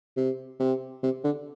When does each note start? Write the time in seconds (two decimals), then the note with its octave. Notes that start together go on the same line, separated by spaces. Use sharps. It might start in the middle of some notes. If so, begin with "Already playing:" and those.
0.17 C3
0.60 C3
1.03 C3
1.24 D3